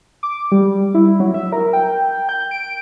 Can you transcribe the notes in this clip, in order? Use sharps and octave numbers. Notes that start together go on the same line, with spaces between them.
D6
G3
E4
F#3
E5
A#4
G5
G6
D7